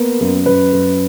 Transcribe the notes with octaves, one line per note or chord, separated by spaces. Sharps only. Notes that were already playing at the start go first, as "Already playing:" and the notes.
Already playing: A#3 B3
F#2
F#2 B4
F#2